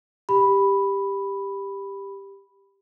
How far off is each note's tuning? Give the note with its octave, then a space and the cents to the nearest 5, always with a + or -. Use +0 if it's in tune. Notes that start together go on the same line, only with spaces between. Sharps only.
G4 +10 B5 +0